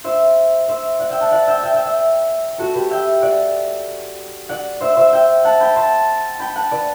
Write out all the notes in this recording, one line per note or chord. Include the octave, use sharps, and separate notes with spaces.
C5 E5
C5 E5
D5 F#5
E5 G5
F#5 A5
D5 F#5
E5 G5
E5 G5
E5 G5
E5 G5
F#4 A4
G4 B4
E5 G5
D5 F#5
D5 F#5
C5 E5
C5 E5
E5 G5
F#5 A5
G5 B5
A5 C6
G5 B5
F#5 A5
B4 D5